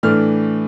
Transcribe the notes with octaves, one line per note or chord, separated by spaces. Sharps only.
A2 E3 A3 D4 F6